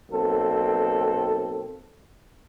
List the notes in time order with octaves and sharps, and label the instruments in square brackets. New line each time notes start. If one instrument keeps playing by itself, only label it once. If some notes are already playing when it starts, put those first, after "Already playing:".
[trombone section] B1 A#3 C4 A4